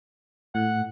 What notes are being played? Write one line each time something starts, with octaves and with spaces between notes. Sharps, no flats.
A2 F#5